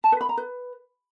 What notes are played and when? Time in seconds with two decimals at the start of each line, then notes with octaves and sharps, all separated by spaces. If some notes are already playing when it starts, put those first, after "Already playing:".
0.04 A5
0.12 B4
0.21 B5
0.29 A#5
0.37 B4